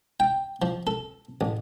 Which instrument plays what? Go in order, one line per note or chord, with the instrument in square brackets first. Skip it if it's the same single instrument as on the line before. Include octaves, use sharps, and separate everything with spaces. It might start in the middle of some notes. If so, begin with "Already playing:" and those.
[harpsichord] G5
F3
A4
A1